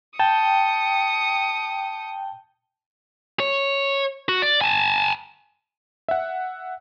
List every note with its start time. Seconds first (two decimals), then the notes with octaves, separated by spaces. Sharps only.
0.19 G5 A5 D#6 C#7
3.40 C#5
4.29 F#4
4.42 D5
4.61 G#5 A5
6.08 E5 F#5